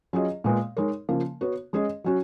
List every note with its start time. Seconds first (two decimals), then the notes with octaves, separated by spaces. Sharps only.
0.13 F#3 C#4 F4 G#4 D#5
0.44 A#2 G#3 B3
0.77 G#3 D#4 A#4 C#5
1.09 C#3 F3 A#3
1.41 B3 F#4 C#5
1.73 G#3 C#4 G#4 D#5
2.04 F#3 C#4 F#4